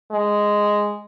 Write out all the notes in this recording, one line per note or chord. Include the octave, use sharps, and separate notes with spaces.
G#3